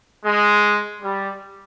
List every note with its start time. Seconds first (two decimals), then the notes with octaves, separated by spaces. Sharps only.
0.24 G#3
1.01 G3